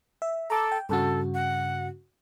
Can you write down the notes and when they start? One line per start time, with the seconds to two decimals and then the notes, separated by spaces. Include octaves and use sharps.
0.22 E5
0.50 A4 A#5 D6 E6
0.72 G5
0.89 G2 C#3 F#4 A4
1.34 F#5